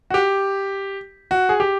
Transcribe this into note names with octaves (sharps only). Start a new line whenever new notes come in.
F#4
G4
F#4
G#4
G4